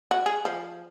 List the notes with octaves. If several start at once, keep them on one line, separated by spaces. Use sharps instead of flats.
F#4
G#4
F3